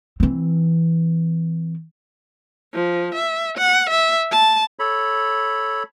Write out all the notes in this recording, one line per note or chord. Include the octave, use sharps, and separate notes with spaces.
E3 C4
F3
E5
F#5
E5
A5
A4 C#5 B5